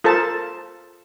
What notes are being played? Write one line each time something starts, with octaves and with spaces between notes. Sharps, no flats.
F4 A4 A#4 C5 A5